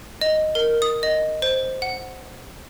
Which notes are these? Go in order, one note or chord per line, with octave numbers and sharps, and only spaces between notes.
D#5
A#4
D#6
D#5
C5
F#5